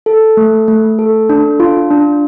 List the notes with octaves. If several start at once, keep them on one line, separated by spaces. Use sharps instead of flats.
A4
A3
A3
A4
D4
F4
D4